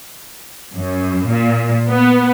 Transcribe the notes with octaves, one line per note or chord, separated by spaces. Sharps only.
F#2
A#2
B3